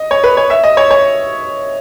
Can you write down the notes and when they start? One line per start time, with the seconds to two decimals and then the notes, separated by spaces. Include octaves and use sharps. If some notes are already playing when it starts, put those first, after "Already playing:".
Already playing: D#5
0.11 C#5
0.24 B4
0.37 C#5
0.50 E5
0.64 D#5
0.77 C#5
0.91 C#5